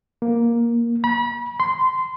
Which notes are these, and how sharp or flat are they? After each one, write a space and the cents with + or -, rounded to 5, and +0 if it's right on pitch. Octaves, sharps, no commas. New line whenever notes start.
A#3 +10
B5 -35
C6 -20